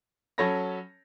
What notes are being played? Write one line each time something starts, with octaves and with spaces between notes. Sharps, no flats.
F#3 C#4 A4 C#5 B5 A#6